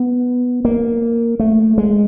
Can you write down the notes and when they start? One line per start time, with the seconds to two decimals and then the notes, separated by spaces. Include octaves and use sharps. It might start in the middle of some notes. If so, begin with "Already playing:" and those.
Already playing: B3
0.65 A#3
1.39 A3
1.78 G#3